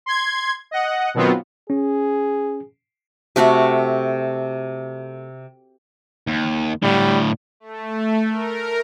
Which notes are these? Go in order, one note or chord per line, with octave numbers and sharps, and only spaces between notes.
C6 G#6
D#5 F#5
B2 D#3 F#3 B3 C4 F4
C#4 G#4
C3 A3 F#4 F#5
D#2
A2 D3 G3
A3
A#4